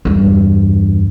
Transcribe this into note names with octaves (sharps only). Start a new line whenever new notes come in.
E2 G2